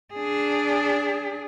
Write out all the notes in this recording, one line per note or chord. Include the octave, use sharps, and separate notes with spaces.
D4 G#4